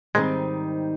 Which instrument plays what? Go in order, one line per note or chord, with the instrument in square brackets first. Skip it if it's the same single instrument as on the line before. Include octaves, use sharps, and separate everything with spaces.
[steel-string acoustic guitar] G#2 D#3 G3 C4 D#4 [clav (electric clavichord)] G#3